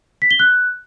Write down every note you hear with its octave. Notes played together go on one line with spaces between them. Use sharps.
B6
G7
F#6